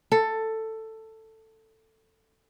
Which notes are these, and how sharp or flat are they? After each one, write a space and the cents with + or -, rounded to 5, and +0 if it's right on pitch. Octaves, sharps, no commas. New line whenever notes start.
A4 +10